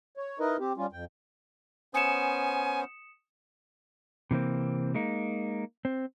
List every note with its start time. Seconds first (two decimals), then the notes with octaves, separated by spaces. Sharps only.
0.17 C#5
0.40 D#4 E4 A#4 B4 D#5
0.60 C4 G4
0.77 G3 C#4 F4
0.92 F2 G5
1.94 B3 C#4 C5 G#5 D#6 C#7 E7
4.31 C3 E3 A#3 C4
4.94 G#3 A#3 D#4
5.85 C4